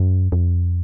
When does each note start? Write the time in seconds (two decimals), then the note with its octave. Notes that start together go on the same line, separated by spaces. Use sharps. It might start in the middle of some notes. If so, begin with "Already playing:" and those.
Already playing: F#2
0.32 F2